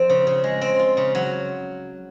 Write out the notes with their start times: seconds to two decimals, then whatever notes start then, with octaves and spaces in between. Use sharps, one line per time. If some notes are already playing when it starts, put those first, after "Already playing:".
Already playing: F3 C4
0.10 C#3
0.27 C#3
0.44 G#3
0.61 C4
0.79 F4
0.97 C#3
1.15 F#3